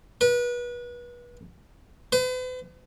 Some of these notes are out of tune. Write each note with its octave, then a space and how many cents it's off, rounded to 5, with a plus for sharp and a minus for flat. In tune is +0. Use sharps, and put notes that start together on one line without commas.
B4 -30
B4 +45